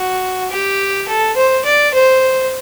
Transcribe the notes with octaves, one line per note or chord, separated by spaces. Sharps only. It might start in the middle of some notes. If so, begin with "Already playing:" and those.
Already playing: F#4
G4
A4
C5
D5
C5